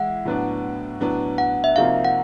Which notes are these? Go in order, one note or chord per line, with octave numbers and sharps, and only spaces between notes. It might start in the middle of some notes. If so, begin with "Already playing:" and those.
Already playing: E3 G#3 E4 F#5
A2 F#3 B3 D4
A2 F#3 B3 D4
F#5
E5
C3 F3 A#3 D#4 F#4 F5
F#5